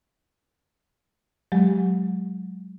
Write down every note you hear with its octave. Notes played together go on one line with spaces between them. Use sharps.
F#3 G#3 G4